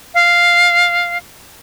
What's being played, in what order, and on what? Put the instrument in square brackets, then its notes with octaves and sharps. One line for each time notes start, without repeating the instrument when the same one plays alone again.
[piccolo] F5